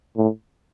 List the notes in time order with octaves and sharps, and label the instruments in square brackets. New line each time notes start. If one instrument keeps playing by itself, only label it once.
[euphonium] A2